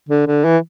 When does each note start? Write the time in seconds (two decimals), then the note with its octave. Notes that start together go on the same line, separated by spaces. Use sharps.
0.09 D3
0.27 D3
0.44 E3